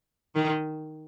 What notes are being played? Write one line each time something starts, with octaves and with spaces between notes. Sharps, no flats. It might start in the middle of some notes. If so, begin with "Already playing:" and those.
D#3